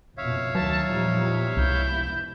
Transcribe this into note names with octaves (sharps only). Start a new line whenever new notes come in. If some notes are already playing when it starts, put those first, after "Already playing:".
F#1 F2 B2 C#5 E5 F5
D2 D#3 F#3 A5
E2 A#2 F3 G3 D#4
F1 C2 G#2 B2 E4 G6